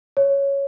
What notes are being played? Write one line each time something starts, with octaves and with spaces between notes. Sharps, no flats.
C#5